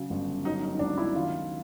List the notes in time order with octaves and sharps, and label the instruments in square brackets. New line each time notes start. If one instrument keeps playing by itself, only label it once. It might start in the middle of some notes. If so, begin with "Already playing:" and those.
Already playing: [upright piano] C#3 F#3
G1
F#3 D#4
D#4
D#4
C#2 D4
E4
D#3 F4